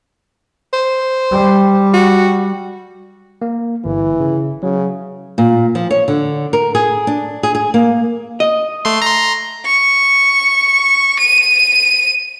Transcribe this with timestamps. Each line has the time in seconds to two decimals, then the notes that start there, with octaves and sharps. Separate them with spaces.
0.73 C5
1.31 G3
1.93 F#4
3.42 A#3
3.85 G1 E3
4.20 C#3
4.63 C#3 F#3
5.38 A#2
5.75 F3
5.90 C#5
6.08 D3
6.53 A#4
6.75 G#4
7.07 D4
7.43 G#4
7.55 G#4
7.74 A#3
8.40 D#5
8.85 A3 C6
9.02 A#5 C6
9.66 C#6
11.19 D#7